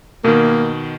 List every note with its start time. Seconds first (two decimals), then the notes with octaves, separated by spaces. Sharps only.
0.24 B2 D#3 A#3